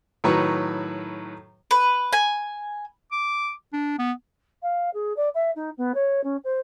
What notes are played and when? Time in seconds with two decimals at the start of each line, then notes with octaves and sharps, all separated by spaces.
0.24 A2 D#3 F#3 B4 A#5 C#6
1.71 B4
2.13 G#5
3.12 D6
3.73 D4
3.99 B3
4.62 F5
4.93 G#4
5.16 D5
5.34 E5
5.55 D#4
5.77 B3
5.94 C#5
6.23 C#4
6.44 C5